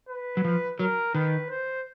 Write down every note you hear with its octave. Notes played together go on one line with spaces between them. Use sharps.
B4
F#3
F3
F#3 A#4
D#3 B4
C5